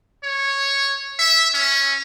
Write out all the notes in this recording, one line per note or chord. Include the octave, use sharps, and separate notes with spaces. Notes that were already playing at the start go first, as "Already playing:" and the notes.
C#5
E5
C#4